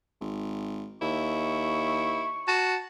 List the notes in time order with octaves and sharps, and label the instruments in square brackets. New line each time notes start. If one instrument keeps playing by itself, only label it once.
[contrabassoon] G#1
[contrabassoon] D#2 [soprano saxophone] E4 [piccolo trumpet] C#6
[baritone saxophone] F#4 [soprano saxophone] A5